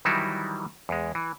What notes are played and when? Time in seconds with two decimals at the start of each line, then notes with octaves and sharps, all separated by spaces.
0.05 D#3 E3 F#3 G3 D#4 E4
0.89 E2 G#3
1.15 E3